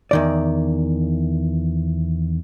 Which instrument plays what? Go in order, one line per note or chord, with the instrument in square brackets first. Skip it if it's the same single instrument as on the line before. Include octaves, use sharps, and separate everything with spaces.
[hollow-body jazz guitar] E2 D#3 D5